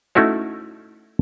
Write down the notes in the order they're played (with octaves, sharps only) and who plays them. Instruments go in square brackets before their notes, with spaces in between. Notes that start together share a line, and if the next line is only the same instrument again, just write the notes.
[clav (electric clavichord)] A3 C#4 D#4 E4 F#4 C#5